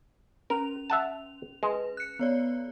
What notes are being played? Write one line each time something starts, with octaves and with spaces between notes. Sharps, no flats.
C#4 A#4 F7
E5 F#5 A5
G#3 B4
F#6 C#7
B3 C#5 D5